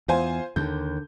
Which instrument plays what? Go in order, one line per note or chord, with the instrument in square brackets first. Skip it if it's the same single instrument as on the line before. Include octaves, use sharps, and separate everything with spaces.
[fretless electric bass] E2 [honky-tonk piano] F4 C5 G#5
[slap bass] D#2 [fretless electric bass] D3 [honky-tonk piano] G6